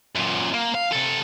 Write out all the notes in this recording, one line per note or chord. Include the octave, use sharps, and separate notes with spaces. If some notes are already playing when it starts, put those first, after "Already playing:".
F#2 A#2
A#3
F5
C3 A4